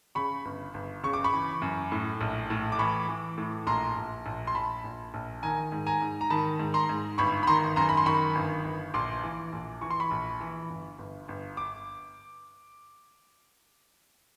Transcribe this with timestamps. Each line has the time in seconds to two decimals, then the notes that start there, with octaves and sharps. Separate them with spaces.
0.15 C#3 B5 C#6
0.45 G1
0.74 G1
1.03 C#3 C#6
1.13 D6
1.24 B5 C#6
1.33 E3
1.62 F#2
1.92 A2
2.21 A#1
2.50 A2
2.72 D6
2.79 E3 B5 C#6
3.08 E3
3.37 A2
3.67 A#1 A#5 C6
3.96 A#1
4.26 A#1
4.47 C6
4.55 A#1 A5 B5
4.84 A#1
5.14 A#1
5.43 D#3 G#5 A#5
5.72 G#2
5.87 G#5 A#5
6.02 G#2
6.21 A#5
6.30 D#3 A5 B5
6.59 G#2
6.74 A#5 C6
6.89 G#2
7.18 G1 B5 C#6
7.43 B5
7.47 D#3 A#5 C6
7.76 F#2 A#5 C6
7.89 B5
7.97 C6
8.06 D#3 B5 C#6
8.35 G1
8.65 G1
8.94 A#1 C6 D6
9.23 E3
9.53 A#1
9.81 E3 C#6
9.90 C6
10.00 B5 C#6
10.11 A#1
10.40 E3
10.69 G1
10.98 G1
11.28 G1
11.57 D6